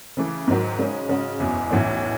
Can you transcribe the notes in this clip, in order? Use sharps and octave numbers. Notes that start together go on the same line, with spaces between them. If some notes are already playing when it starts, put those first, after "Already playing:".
C#3 E3 A3
G#2 D#3 F#3
C#3 G#3 C#4
C#3 G#3 C#4 F#4
F#1 E2 B2
B1 A2 E3 A3 C#4